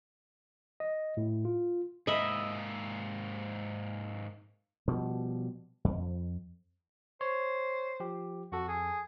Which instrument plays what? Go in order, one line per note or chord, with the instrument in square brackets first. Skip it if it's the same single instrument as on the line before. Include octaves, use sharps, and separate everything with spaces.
[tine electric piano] D#5
A2
F4
[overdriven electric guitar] G#2 A#3 [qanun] D#5 E5 B5
[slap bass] B2 F3 G3
F2
[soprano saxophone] C5 [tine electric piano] C#5
[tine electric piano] F3 G4
[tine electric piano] F2 A4 [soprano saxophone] F#4
[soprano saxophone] G#4